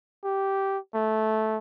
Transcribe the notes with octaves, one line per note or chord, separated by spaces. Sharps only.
G4
A3